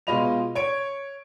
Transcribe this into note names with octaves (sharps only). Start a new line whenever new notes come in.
B2 G#3 F4 D#5 B5 F7
C#5 G#6 D7